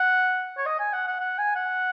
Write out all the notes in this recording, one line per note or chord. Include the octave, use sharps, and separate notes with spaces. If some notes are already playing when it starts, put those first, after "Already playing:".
Already playing: F#5
C#5
D#5
G#5
F#5
F#5
F#5
G#5
F#5